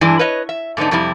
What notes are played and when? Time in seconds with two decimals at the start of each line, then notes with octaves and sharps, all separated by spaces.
0.01 G2 E3 G#3 D4 E4
0.19 B4 C#5 D#5
0.49 E5
0.77 G#2 D3 B3 D4 D#4
0.91 F2 C3 G3 E4